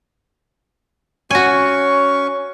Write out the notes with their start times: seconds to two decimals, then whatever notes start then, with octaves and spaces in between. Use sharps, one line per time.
1.31 C#4 F#4 G#5 C#6